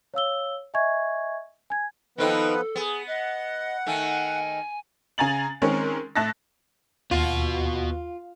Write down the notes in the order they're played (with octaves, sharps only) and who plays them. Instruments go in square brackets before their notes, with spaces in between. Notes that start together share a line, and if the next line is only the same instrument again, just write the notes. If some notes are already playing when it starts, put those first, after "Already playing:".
[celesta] C#5 F5 E6 G7
D#5 E5 G#5 C#6 G#6
G#5 G#6
[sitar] D#3 C4 D#4 [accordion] F3 B3 B4 [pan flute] A4
[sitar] B3 [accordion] G#4
[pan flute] D#5 [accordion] F#5
[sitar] D#3 A3 [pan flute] G#5
[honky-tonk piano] C#3 G#5 A#5 A6 F#7
D#3 G#3 C4 C#4 A#4 C#5
A2 E5 A5 F#6 A6 A#6
[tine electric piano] D#2 [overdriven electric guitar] B3 F#4 [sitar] F4